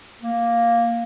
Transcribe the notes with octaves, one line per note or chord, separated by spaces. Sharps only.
A#3